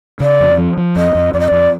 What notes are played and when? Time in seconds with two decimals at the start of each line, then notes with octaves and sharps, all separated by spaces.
0.20 C#3 D5
0.40 F2
0.58 F3
0.77 F3
0.96 F2 D#5
1.15 F2
1.34 F2 D5
1.40 D#5
1.48 F2 D5